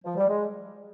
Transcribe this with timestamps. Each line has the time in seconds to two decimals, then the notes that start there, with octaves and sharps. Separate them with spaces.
0.04 F3
0.17 G3
0.28 G#3